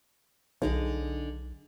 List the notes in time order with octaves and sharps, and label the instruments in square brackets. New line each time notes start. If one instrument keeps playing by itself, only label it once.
[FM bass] B1 [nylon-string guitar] D3 D#4 G#4